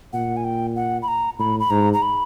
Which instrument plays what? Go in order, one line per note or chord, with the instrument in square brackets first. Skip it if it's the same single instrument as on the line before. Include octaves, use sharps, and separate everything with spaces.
[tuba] A#2 [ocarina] F#5
[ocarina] G#5
G5
F#5
B5
A#5
[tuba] A2 [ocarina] B5
[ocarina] B5
[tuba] G#2 [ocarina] A#5
[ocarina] A#5
B5